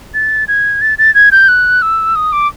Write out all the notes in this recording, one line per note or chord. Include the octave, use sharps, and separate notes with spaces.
A6
G#6
A6
A6
G#6
G6
F#6
E6
D#6
D6